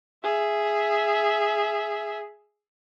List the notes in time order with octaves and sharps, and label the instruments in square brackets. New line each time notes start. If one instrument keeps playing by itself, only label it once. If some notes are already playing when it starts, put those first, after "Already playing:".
[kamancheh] G#4 E5